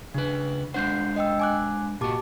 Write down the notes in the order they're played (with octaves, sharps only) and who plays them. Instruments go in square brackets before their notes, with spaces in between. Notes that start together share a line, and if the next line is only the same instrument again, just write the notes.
[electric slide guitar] C#3 B4 [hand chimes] D4
[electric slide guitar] G#3 D4 C5 [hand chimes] F#5 G6 C7
[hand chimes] D#5 G5 E6
G#5 D6 F#6
[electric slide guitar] A#2 F#4 [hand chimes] G4 A5 D6